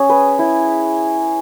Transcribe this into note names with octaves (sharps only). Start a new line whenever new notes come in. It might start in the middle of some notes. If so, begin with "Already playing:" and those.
Already playing: C#4 G#4
B4
E4